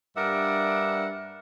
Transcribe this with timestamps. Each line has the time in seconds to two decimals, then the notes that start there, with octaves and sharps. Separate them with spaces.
0.17 G2 D4 A#4 E5 F#5